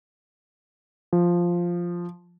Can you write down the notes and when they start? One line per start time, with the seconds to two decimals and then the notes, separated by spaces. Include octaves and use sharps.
1.13 F3